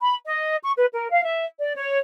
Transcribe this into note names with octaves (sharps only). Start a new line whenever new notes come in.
B5
D#5
C#6
B4
A#4
F5
E5
D5
C#5